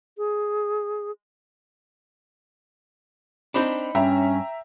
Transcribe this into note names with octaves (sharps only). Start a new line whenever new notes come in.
G#4
C4 D4 D#4 B5
G2 C#4 E5 G5 A#5